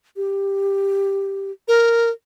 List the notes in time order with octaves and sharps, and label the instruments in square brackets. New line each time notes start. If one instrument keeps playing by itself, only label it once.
[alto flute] G4
[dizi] A#4